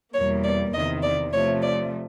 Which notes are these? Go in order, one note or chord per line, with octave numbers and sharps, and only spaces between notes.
E2 B2 G3 A#3 C#5
D5
E2 C3 D#3 D#5
D5
C3 F3 A3 C#5
D5